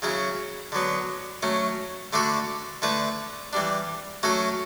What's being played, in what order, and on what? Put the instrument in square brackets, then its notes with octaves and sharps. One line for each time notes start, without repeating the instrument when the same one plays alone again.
[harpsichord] C#3 F#3 C#4 E4
D3 F#3 B3
F#3 A3 C#4
D3 A3 D4 F#4 A4
D3 A3 E4 B4
E3 G3 D4
F#3 A3 C#4 F#4 A4